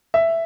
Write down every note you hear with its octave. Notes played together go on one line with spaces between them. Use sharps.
E5